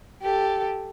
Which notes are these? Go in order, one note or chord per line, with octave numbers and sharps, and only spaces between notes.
G4 A4